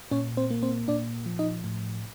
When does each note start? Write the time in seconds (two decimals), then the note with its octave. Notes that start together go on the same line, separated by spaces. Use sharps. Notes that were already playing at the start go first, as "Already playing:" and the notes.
0.11 A#2 C#4 C#5
0.37 C4 C5
0.50 A#3
0.63 C4 C5
0.88 A#2 D4 D5
1.26 F3
1.39 D#4 D#5
1.64 A2